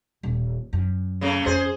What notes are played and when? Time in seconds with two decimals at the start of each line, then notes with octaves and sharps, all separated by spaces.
0.23 D#1
0.73 F#2
1.21 C#3 A3
1.46 F2 G#4 C5